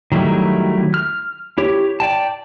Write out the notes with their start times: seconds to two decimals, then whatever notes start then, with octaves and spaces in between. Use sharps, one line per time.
0.12 D#3 F#3 G3 A3 E4
0.94 F6
1.58 E4 G4 C#5
2.00 D5 G5 A5